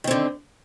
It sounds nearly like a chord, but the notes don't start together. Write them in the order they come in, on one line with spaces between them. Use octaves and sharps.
D#3 C4 D3